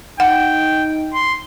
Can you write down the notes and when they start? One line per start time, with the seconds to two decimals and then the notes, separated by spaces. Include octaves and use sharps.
0.20 D#4 F#5 G5
1.14 C6